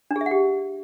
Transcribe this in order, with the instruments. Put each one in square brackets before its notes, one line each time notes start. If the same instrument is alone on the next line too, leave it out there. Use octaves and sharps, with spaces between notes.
[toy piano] D4
G#4
E5
F#5
G4